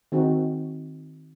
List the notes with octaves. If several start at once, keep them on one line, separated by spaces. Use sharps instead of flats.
D#3 C4 D#4 F#4